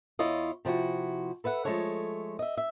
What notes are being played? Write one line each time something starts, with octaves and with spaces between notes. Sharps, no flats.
E2 E4 F4 C#5 D#5
C3 F3 E4 F#4
A4 B4 E5 F#5
F3 G#3 A3 A4 C#5
D#5 E5
E5